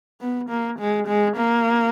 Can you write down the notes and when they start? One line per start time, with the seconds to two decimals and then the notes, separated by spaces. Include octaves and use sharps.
0.21 B3
0.50 A#3
0.79 G#3
1.08 G#3
1.37 A#3